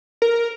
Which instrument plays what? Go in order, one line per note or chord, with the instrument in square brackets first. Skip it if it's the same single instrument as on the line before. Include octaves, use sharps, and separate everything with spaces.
[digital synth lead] A#4